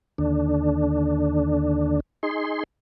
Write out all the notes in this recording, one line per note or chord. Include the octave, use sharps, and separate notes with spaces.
D#2 D3 D4
D#4 G#4 C6